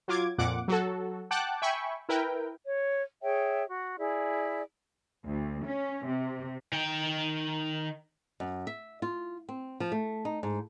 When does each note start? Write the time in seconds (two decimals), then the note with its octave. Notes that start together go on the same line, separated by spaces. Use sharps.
0.08 F#3 F4 D6 G#6
0.38 F2 A#2 F#5 D6
0.68 F#3 F#4 A4
1.31 F#5 G5 A5 D6 F#6
1.62 E5 G5 G#5 B5 C#6
2.09 E4 A#4 B4 G5
2.65 C#5
3.22 G#4 C#5 E5 G5
3.69 F#4
3.98 E4 G#4 D5
5.25 D2
5.65 C#4
6.06 C3
6.73 D#3 G5
8.40 F#2
8.67 E5
9.02 F4
9.49 C4
9.80 F3
9.92 A3
10.25 D#4
10.43 G#2